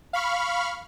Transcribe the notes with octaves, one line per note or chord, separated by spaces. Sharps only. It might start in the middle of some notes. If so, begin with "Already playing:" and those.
F5 B5 C#6 F6